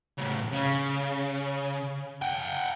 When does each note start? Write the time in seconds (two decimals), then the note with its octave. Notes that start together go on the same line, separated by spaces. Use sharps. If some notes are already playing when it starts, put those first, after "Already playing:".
0.18 A2 C#3
0.52 C#3
2.22 F#5 G5